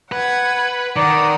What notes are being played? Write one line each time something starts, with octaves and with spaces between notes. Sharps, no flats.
B4 F#5 G#6
D#3 D5 F#5 A#5 D#6